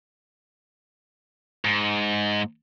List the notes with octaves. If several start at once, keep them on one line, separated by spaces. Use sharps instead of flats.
G#2